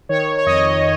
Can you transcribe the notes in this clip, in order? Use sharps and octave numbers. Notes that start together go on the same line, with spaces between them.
D#3 C#5
C#5
F2 D#5